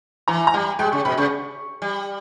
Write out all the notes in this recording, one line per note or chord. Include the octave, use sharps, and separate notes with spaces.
E3 A#5
A#5
G3 G#5
G#3 G5
C#3 C#6
B2 B5
C#3 C#6
G3